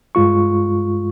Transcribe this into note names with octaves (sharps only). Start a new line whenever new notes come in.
G2 G#3 F4 C#6